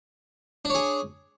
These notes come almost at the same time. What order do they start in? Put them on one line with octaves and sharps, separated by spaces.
D4 C#5 G#4